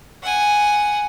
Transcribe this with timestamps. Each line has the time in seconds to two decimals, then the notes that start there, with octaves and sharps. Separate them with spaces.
0.23 F#5 G#5